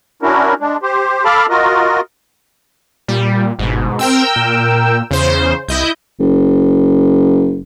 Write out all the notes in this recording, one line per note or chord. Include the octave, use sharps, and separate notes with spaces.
C#4 D4 E4 F#4 A#4
G#3 D4
G4 C5
A4 F5 A5 B5 D6 F6
F4 F#4 A#4 D#5
A#2 G3
G1 G#2 B2
C4 A#4 G5 E6
A#2
E2 C#3 C5
C2 E4 D#5 G6
F#1